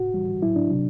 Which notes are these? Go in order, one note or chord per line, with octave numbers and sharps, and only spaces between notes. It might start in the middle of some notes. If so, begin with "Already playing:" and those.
Already playing: F#4
A2 E3 G3
A2 F#3 E4
D4
C3 F#3